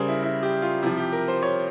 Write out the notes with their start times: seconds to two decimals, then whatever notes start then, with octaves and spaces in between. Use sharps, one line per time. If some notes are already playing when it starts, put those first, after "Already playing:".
Already playing: C#3 G3 G#4 A#4 C5
0.08 E4
0.23 E4
0.43 G4
0.62 F4
0.83 C3 F3 E4
0.98 G4
1.13 A#4
1.28 C5
1.43 C#5